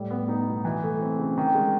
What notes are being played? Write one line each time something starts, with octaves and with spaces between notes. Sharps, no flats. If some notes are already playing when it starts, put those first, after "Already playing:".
Already playing: A2 G3
B3
D#4
B2
E3
A3
C4
C#3
D#3
G#3